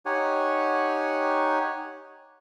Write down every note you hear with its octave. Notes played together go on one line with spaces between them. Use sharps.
D#4 G4 C#5 F#5 G#5